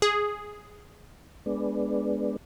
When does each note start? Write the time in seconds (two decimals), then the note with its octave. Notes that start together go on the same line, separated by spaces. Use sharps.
0.02 G#4
1.46 G#3 B3 D4